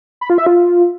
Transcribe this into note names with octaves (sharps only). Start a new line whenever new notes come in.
B5
F4
E5
F4